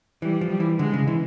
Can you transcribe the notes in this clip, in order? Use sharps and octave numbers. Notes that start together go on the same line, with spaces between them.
E3 G3
F3
G3
E3
D3 G#3
C#3
E3